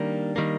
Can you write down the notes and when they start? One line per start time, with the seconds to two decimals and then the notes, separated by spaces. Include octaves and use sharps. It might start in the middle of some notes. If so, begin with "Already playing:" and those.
Already playing: D#3 G3 A#3 D4
0.36 D#3 G3 A#3